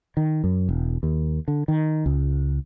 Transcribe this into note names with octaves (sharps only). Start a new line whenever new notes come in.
D#3
F#2
E1
D#2
D3
D#3
C#2